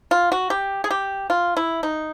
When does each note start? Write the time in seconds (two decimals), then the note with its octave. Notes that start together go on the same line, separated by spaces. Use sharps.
0.11 F4
0.32 F#4
0.50 G4
0.84 G#4
0.90 G4
1.30 F4
1.57 E4
1.83 D#4